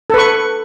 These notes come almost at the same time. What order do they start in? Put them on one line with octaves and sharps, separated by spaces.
A4 B4 C#6